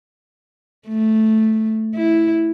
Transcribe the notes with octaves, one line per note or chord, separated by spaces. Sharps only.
A3
E4